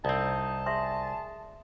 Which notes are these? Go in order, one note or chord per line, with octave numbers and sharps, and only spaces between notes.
C2 C4 D#4 A5
G#4 E5 C6 C#6